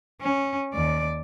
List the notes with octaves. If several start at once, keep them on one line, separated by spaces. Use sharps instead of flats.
C#4
D#2 D5